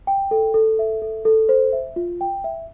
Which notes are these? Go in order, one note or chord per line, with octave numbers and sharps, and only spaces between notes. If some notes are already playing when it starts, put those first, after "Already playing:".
G5
A4
A4
E5
A4
A4
C5
E5
F4
G5
E5